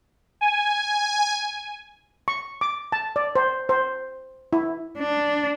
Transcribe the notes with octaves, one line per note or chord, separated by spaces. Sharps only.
G#5
C#6
D6
A5
D5
C5
C5
E4
D4